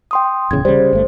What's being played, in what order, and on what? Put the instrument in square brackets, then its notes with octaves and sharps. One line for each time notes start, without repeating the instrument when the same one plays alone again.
[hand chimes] G5 C6 D#6
[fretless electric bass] D1 E2 C#3 [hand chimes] G#6
[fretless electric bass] C#3 G3 [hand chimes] C5
[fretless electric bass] G1 A3